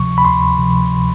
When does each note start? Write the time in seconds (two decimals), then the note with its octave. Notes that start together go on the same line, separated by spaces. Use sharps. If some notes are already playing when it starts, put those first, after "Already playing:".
Already playing: D2 C3 F3 C#6
0.18 B5
0.25 D2 C6
0.58 C3 F3